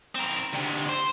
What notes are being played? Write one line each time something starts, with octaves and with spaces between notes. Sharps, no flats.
C4 A#4
D2 C3
C5